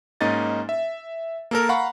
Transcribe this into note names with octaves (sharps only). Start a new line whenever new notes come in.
G#2 A#3 C#4 D#4 D#5 A6
E5
A#3 A4 A#4
F5 F#5 A#5 B5 C#6